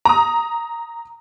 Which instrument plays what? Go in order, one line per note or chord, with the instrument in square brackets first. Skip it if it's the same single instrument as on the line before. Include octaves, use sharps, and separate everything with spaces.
[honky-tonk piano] A#5 D#6